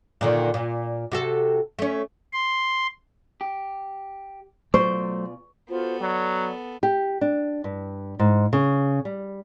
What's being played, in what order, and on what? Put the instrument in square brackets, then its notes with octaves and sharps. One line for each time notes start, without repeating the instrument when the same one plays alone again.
[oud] A#2 D3 D#3
A#2
C3 F#4 A4
A3 C#4
[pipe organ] C6
[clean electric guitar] G4
[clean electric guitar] B2 F4 D5 [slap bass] F#3 A3 [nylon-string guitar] C5 [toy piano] C#6
[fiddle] B3 A4 [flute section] F4 F#4 C5
[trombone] F#3 [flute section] D5
[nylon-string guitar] G4
D4
G2
G#2
C#3
G3